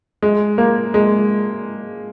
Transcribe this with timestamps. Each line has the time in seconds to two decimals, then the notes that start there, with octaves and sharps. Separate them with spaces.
0.23 G#3
0.58 A#3
0.94 G#3